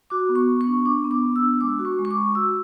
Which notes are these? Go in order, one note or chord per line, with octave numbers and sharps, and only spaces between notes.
F#4 D6
B3
C#6
B3
C#6
D4
D4 D6
B3
D6
B3
E6
D4
G#3 D6
F#4
C#6
G#3
C#6
D6
G#3
F#4 E6